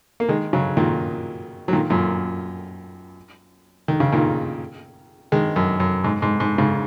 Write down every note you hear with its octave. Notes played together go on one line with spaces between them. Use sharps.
A#3
D#3 G#3
C#3 F#3
A#2 D#3
F#3
A#2 D#3
F#2 A#2
D#3
C#3
A#2 D#3
D#3 G#3
F#2
F#2
G#2
G#2
G#2
G#2 C#3